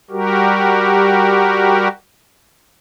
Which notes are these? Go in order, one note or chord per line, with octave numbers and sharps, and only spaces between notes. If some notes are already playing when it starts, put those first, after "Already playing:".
G3 F#4 G4 A#4